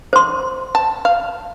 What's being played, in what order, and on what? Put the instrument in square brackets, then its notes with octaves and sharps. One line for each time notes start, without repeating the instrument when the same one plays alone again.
[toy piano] C5 C6
[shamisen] A5
F5